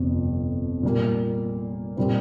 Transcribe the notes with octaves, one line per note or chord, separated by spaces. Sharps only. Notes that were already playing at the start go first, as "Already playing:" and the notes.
Already playing: G1 F2 C3
A#2 G3 A#3
A#2 G3 C4